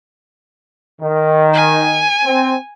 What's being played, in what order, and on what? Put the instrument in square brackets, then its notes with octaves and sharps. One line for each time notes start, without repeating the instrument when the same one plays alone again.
[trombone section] D#3
[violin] G#5
[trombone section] C4